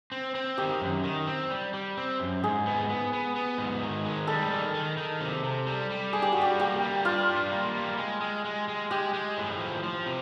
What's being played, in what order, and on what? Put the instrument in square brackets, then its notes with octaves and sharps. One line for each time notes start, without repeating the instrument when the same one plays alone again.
[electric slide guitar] C4
C4
[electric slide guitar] D#3 [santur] G4
[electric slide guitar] F#2
D#3
C4
G3
G3
C4
F#2
[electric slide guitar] G#2 [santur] G#4
[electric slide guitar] B3
B3
B3
B3
G#2
D#3
G#3
[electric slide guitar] G3 [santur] A4
[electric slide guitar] D#3
D#3
D#3
C3
C3
G3
G3
[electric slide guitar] D4 [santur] G#4
[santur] G4
[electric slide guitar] G3 [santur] F#4
[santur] G4
[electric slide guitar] A#3 [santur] G4
[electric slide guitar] G3
[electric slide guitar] D4 [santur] F4
[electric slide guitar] G3
A#3
G3
G#3
G#3
G#3
G#3
[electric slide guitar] G#3 [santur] G4
[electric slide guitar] G#3
A2
F3
F3
C3